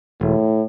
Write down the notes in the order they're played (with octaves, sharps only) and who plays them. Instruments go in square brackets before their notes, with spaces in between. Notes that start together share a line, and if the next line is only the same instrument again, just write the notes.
[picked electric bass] E1 [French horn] A2